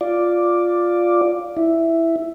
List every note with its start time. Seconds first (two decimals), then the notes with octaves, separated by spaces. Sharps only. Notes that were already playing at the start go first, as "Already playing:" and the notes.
0.01 F4 D5
1.57 E4